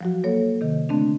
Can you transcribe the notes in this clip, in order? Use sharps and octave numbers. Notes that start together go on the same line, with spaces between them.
F3 F#3 F#4
F#3 A#3 A4 C#5
C3 D#3
D3 A3 C4 D4